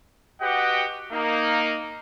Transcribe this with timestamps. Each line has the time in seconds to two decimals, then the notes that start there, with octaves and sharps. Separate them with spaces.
0.41 F#4 G4 B4 D#5 F#5 G5
1.12 A#3 D#4